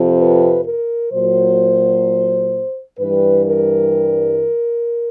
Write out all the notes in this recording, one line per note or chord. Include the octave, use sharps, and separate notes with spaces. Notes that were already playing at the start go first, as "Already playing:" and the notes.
Already playing: F2 C3 F3
B4
A#4
A#2 F#3 C5
G2 E3 G3 B4
A#4